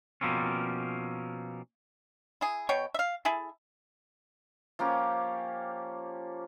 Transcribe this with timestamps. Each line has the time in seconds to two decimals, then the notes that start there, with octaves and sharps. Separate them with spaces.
0.21 B2 F3 A#3 C4 C#4
2.41 E4 G#4
2.69 B2 C#5 G5
2.94 E5 F5
3.25 E4 G#4 A4
4.79 F3 A#3 C#4 G4